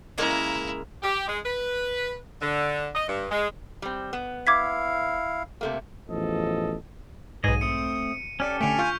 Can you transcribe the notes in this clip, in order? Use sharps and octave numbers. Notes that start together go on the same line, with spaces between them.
C#3 G#3 A#3 E4 A#5
G4
G#3
B4
D3
D#5
G2
G#3
G3 C4
B3
E4 F5 D6 G#6 B6
C3 A3 A#3
A1 E2 F3 A4 D#5
B1 G#2 G#4 B4 D#5 D#7
A3 C4 D#6 C#7
C#4 G4 A4 D5 F6
D3 A3 G#5 B6 D7 F7
F4 C#6 F6 G6